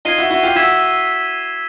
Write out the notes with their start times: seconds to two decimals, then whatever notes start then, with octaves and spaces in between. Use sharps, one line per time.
0.05 D#4 F4 G#6 C7 D#7 G7
0.18 E4 F#4
0.30 E4 F#4
0.43 F4 G4
0.56 E4 F#4 E6 G#6 B6 E7